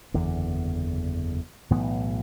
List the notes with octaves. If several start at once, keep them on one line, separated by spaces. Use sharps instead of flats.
F#1 E2 D3
B1 A2 E3 B3